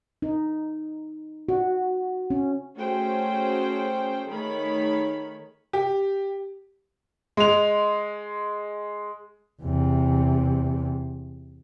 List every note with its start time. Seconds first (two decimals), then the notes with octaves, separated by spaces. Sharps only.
0.22 D#4
1.49 F#4
2.30 C#4
2.76 A3 C#4 F#4 G#4 C5 G5
4.29 D#3 A3 G#4 C#5 B5
5.73 G4
7.37 G#3 F7
9.62 E2 C3